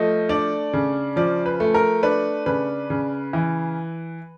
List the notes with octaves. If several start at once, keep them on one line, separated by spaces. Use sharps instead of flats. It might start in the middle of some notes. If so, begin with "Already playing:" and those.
Already playing: F3 A3 D#5
D4 D5
C#3
F3 D5
B4
A3
A#4
D4 B4
C#3 B4
C#3
E3